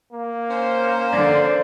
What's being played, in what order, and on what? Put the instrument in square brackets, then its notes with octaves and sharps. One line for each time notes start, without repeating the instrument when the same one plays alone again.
[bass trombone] A#3
[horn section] C#4 C5
[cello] D3 [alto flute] D5